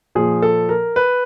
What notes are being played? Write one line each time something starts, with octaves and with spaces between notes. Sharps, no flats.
A#2 F3 G#4
A4
A#4
B4